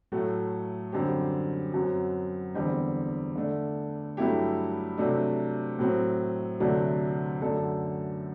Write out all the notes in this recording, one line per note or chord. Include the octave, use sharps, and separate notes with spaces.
A2 F#3 A3
F#2 D3 G3 C4 G4
F#2 F#3 C4
E2 D3 G3 C4
D3 A3 D4
G2 F#3 A3 E4 G4
C3 F#3 A3 D4
A2 F#3 C4
D2 C3 F#3 A3 D4
F#2 D3 A3 D4 A4